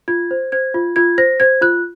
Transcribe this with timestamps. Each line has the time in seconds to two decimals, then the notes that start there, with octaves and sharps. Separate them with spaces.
0.08 F4 G#6
0.31 C5
0.52 C5 G#6
0.74 F4
0.96 F4 G#6
1.18 C5 A#6
1.40 C5 G#6
1.61 F4 F#6